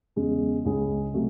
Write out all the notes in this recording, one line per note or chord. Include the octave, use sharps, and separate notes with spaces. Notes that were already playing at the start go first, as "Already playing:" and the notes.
E2 C#3 G#3
C#2 C#3 G#3 C#4 G#4
C3 F#3 A3